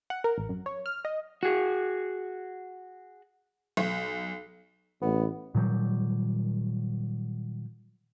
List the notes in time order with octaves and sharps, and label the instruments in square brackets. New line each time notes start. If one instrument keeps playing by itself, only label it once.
[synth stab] F#5
A#4
A1
F#2
C#5
F6
D#5
[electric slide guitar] F#4 G#4
[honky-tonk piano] B1
[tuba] A1 [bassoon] B3
[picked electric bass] A#2 D#3 F#3 G3